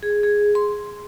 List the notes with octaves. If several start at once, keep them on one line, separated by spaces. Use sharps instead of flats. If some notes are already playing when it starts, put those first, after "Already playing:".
G#4
G#4
C6